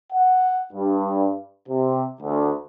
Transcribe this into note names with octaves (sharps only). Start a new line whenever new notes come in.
F#5
G2
C3
D2